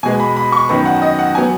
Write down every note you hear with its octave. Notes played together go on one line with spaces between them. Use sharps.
B2 G#3 B3 G#5
B5
B5
C#6
F#2 D#3 B3 B5
F#5
D#5
F#5
F#3 B3 G#5